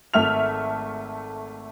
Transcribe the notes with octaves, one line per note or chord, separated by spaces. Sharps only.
G#1 A3 E5 F6 F7